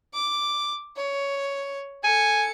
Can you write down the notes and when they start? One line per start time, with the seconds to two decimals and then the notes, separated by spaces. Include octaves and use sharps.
0.14 D6
0.96 C#5
2.04 A4 G#5 C#7